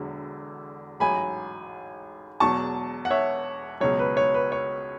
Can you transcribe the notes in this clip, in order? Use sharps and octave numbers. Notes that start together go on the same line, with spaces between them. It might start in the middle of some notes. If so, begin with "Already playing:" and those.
Already playing: E1 E2 D3 F#3
A1 G#2 F#3 G#5 B5
E1 E2 B2 F#3 A5 C#6
F#5
C#5 E5
C#2 B2 F#3 C#5
B4
C#5
B4
C#5